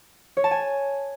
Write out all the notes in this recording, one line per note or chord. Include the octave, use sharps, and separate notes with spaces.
C#5
A5
G#5